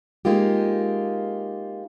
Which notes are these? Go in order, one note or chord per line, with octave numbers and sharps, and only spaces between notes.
G#3 A#3 D#4 F4 G4